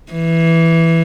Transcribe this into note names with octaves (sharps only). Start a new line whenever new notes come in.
E3